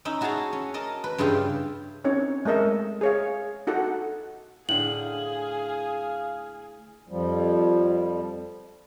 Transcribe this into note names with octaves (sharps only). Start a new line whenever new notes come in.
C#4 D#4 E4 E5
E4 F#4 G#4 C#5 A5 A#5
C#4
A#4 D#5 A5
B4
G2 C#3 E4 F4 G4 F5
C4 C#4 D#4 E4 C#5
G#3 A3 A#4 D#5 E5
G#4 C#5 F5
D#4 F#4 A4 F#5
A2 D3 G#4 F5 F#7
F2 F3 G3